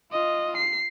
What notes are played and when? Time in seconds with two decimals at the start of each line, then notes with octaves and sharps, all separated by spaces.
0.12 F4 D#5
0.57 C7